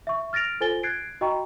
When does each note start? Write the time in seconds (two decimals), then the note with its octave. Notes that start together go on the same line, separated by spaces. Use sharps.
0.07 E5 C#6
0.33 F6 A6 A#6 D7 F7
0.60 F4 A4 C5 G#5 A6 G7
0.83 F#6 G#6 A6 C7 D7
1.21 F#4 D#5 G5 A#5 C#6